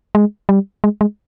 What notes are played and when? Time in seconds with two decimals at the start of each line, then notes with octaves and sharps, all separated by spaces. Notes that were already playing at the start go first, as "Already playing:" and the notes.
0.15 G#3
0.49 G3
0.84 G#3
1.01 G#3